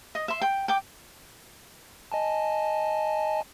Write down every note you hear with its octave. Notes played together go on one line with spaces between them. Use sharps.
D#5
E5 C6
G5
G5 D6
D#5 G#5 A5